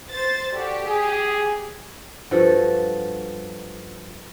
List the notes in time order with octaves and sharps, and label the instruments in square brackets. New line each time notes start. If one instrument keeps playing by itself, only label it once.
[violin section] C5 A6
[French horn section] F#4 A4 D5 [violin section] G4
[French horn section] G#4
[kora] G2 F3 F#4 A4